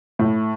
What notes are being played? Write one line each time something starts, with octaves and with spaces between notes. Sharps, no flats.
A2